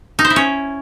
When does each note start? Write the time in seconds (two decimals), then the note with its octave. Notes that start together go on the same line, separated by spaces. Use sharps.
0.19 D#4
0.25 C5
0.30 E4
0.36 C#4